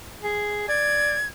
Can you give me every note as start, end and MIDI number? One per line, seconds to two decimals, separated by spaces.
0.22 0.67 68
0.68 1.16 74
0.68 1.26 92